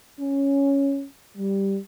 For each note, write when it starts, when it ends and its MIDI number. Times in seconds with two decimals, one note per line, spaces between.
0.20 1.04 61
1.37 1.78 55